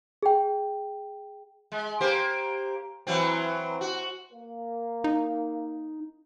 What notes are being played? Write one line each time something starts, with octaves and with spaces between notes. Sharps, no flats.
G#4 G5
G#3
A#3 G4 C5
E3 F#3 C4
F#4
A#3
D#4